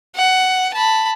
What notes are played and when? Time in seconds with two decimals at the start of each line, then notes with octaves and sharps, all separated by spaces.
0.15 F#5
0.74 A5 B5